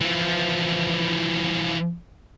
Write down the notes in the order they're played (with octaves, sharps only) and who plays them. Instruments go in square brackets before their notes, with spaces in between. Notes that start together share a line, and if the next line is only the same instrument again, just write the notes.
[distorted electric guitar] E3 F3